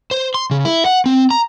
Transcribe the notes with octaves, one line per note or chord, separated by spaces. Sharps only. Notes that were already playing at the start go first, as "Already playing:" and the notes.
C5
C6
C#3
E4
F#5
C4
A#5